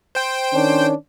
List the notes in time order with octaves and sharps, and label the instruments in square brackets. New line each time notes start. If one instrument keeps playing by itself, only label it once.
[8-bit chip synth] C5 G5
[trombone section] D#3 C#4 D4